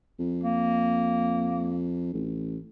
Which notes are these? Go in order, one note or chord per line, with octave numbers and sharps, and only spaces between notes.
F2
A#3
A1